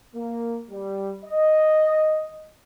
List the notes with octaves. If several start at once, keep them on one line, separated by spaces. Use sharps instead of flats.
A#3
G3
D#5